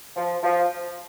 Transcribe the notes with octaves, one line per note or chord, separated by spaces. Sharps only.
F3
F3